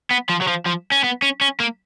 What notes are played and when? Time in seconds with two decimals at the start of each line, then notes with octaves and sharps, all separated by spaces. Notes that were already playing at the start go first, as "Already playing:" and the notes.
0.11 B3
0.30 F3
0.42 F#3
0.48 F3
0.66 F3
0.92 C#4
1.04 B3
1.22 C#4
1.41 C#4
1.60 A#3